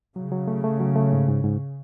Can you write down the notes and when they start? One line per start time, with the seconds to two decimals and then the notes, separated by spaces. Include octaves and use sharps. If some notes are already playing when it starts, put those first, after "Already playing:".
0.16 C#3 F#3
0.31 F#3
0.48 A3
0.64 A3
0.80 F#3
0.96 A3
1.13 G#2
1.28 G#2
1.44 G#2